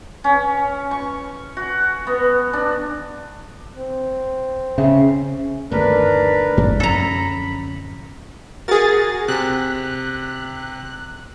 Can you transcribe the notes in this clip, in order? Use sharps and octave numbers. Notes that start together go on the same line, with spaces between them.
C#4
C#6
F#4
B3
D4
C4
C#3 C#4 E5
G1 D#2 F3 A3 D4 A#4 B4
G1 F#2 F3
D1 F#2 F3 C#4 A4 A#5 B5
F#4 G#4 A#4 A6
C3 F#6